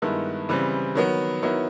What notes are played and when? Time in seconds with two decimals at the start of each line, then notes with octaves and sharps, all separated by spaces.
0.02 G2 D#3 G#3 B3 E4
0.49 C#3 E3 G3 C4
0.95 D#3 F#3 B3
1.43 D#3 F#3 B3 E4